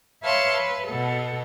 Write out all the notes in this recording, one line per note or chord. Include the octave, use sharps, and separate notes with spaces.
B4 C#5 E5 F5 A5 C6
B4
B2 B3 A4